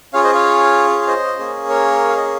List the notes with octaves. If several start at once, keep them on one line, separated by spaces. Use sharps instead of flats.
C#4 F4 G#4 C#5 F5
C5 D#5
C#5 F5
F5
C5 D#5
A#3 C#4 G#4
A#4 C#5
F5
D#5